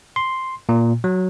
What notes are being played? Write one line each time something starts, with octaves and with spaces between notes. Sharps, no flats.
C6
A#2
F#3